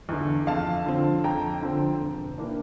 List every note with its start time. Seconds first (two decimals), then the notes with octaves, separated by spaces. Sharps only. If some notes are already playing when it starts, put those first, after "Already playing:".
0.09 E2 D3
0.47 F2 F5 A5
0.86 D3 F3 C4
1.24 F2 G5 A#5
1.62 D3 F3 C4
2.00 E1
2.38 E3 A#3 D4